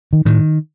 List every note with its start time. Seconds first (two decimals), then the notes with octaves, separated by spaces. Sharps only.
0.13 D#3
0.25 A2 D#3